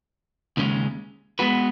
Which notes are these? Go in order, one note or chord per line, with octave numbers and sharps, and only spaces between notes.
D#2 C#3 G#3 C#4
G#3 B3 F#4 B4